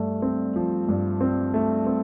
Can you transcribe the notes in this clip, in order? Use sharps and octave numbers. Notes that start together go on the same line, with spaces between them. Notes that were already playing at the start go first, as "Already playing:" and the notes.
Already playing: G2 A3
C4
F3
G2
C4
A3
C4